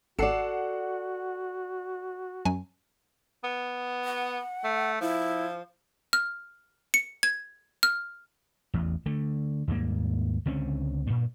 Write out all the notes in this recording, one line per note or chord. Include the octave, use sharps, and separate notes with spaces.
G#1 F#4 A4 D5 F#5 C7 C#7 E7
F#2 F#3 G#5
B3
F#5
A3
F3 E4
F6
C#7
G#6
F6
A1 E2
D3 A3
D#2 G#2 G3 A#3
C#2 D3 C4 C#4
G2 A#2